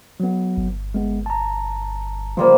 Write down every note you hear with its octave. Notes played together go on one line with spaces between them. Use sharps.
F#3 B3
G1
G#3 B3
A5 A#5
C#3 F3 G3 A#3